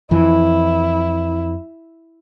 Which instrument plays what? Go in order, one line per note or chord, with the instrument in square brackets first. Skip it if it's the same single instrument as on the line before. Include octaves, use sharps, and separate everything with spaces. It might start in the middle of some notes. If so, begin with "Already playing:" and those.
[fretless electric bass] F2 E3 [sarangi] E4